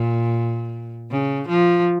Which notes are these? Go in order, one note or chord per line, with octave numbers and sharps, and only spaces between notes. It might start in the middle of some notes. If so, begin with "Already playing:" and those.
Already playing: A#2
C#3
F3